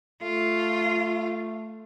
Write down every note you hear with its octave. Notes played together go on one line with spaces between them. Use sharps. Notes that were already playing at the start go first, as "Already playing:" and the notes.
A3 F4